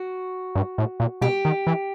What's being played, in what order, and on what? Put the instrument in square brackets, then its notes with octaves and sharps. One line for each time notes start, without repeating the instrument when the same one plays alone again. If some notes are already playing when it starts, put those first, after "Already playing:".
Already playing: [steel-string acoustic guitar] F#4
[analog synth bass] G2
A2
A#2
[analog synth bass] B2 [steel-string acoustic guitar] G4
[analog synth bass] D#3
E3